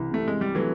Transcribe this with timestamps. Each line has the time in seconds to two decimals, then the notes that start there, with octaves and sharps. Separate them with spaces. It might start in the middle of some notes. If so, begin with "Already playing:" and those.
Already playing: C2 E3
0.11 C3 A3
0.28 G#3
0.41 G3
0.55 E3 F#3 A3